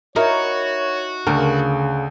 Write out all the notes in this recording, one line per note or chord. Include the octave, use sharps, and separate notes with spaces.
D#4 E4 F#4 A#4 C#5
D2 C#3 A4 A#4